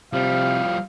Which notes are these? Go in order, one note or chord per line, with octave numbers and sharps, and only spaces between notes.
C3 F3 G3 F5